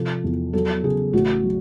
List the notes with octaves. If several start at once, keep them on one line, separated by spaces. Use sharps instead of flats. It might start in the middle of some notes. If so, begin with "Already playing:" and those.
Already playing: C3 F3 A4
E2
F#3 A4
C#3 G#4
A1 F#4
F#3